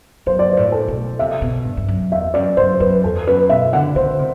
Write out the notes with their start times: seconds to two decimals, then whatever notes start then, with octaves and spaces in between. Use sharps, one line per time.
0.26 F#2 C5
0.39 D5
0.53 A2 C5
0.72 A4
0.88 B2
1.19 C3 E5
1.42 B2
1.65 G2
1.77 G2
1.88 F#2
2.12 E2 E5
2.34 F#2 D5
2.57 F#2 C5
2.80 F#2 B4
3.04 E2 A4
3.27 F#2 B4
3.49 B2 E5
3.73 D3 F#5
3.96 D3 C5
4.19 C3